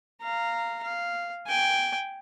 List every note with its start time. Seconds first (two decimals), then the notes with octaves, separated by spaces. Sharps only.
0.22 F5 A#5
0.83 F5
1.47 G5 G#5